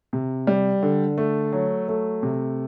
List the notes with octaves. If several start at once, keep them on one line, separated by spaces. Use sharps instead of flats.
C3
G3
D3
A3
F#3
A3
C3